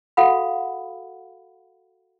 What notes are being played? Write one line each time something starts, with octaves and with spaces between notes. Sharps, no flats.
F#4 A4 F5 F#5 B5